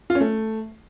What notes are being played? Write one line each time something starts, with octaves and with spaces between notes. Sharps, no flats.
F4
C#4
A3